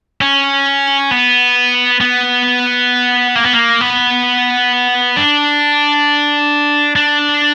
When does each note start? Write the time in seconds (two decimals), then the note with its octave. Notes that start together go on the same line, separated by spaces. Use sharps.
0.21 C#4
1.11 B3
2.01 B3
3.35 A#3
3.44 B3
3.53 A#3
3.81 B3
5.17 D4
6.96 D4